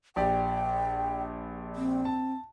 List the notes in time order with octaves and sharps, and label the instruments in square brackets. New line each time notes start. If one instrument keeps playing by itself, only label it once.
[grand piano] A#1 G4 D5 [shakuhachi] G5
[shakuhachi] C4
[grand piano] A5